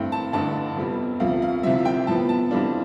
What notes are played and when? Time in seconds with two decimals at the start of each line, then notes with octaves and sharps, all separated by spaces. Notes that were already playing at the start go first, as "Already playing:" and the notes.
Already playing: G2 E3 A3 C4 G5
0.12 A5
0.33 A1 G2 D3 A3 A5
0.76 F2 C3 G3 B3
1.20 D2 C3 F3 F5
1.42 F5
1.63 C2 C3 F3 E5
1.85 G5
2.07 A2 F3 B3 A5
2.29 A5
2.51 F2 E3 G3 D4 F4